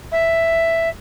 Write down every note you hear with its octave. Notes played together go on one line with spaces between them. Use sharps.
E5